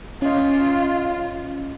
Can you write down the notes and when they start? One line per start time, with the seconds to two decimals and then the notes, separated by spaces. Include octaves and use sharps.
0.22 C#4 F4 D#5